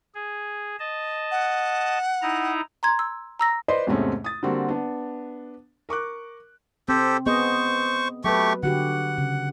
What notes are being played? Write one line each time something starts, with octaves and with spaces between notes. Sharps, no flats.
G#4
D#5 A5
F#5
D#4 E4 A#5
A#5 C6 G#6
E6
A#5 E6 A#6
B4 C5 D5 D#5 C6
E2 G#2 C3 A3 C4 C#4
D#6 A6
D3 G3 A#3 C4 F#4
B3 D4
A#4 C#6 D6 F#6
C4 G4 A4 C5
B3 G#4 C5 D#5 C#6
F#3 A3 G4 B4 C#6
D3 F#4 G4 F#5
C#3